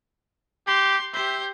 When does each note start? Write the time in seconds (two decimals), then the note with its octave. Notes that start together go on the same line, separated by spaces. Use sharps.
0.67 G4 C6
1.13 G4 C5 E5